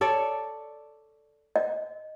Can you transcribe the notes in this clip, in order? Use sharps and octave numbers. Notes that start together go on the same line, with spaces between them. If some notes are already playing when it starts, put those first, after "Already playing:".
A4 C#5 D5
D#5